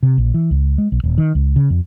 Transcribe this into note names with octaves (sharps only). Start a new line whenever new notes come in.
C3
A#1
E3
C#2
G#3
B1
D#1
D#3
C#2
C#3
F2